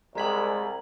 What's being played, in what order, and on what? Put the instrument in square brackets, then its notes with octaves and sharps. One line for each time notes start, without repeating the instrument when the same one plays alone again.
[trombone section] C2 [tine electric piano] G3 G#3 B6 [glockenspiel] A#5 G#6 F#7